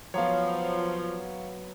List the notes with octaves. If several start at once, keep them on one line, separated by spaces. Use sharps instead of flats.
F3 F#3 B3 C#5 F5